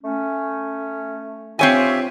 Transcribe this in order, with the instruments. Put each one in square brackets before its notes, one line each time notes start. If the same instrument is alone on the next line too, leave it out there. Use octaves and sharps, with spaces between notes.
[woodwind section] A3 C#4
[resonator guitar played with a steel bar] C4 C#5 G#5 [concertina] F4 G4 E5